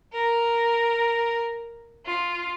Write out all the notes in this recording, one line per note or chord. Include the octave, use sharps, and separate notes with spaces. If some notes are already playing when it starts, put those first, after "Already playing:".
A#4
F4